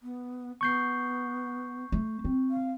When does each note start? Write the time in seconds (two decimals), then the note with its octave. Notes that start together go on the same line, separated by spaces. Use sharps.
0.02 B3
0.61 B3 C#6 G6 C7
1.92 A3
2.25 C4
2.50 F5